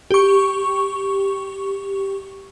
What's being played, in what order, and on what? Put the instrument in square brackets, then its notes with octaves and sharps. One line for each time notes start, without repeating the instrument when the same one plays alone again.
[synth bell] G4 C#6